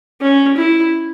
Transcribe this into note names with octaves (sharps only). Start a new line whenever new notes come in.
C#4
E4